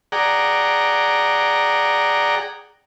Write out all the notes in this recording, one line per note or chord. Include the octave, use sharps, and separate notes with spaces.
G#4 D5 F#5 G5 A#5